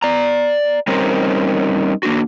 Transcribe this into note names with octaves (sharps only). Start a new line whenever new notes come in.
D5 A#5
G3 C4 C#4 D#4 A#4 C5
A#3 D4 F#4